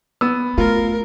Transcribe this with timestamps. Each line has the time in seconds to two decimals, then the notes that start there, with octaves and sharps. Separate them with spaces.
0.21 B3 E6
0.58 A3 F4 A#4